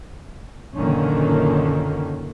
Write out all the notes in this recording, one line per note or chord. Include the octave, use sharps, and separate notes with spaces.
F#1 A#2 D3 D#3 A#3 C#4